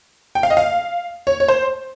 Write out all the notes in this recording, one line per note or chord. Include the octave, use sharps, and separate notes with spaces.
G5
F5
D#5
F5
C#5
C#5
C5